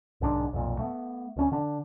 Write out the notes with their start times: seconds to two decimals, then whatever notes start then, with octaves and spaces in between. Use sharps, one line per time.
0.21 B1 G#2 D#3 D4
0.53 B1 F2 A#2
0.79 A3 B3
1.36 D2 C#4
1.52 D3 D4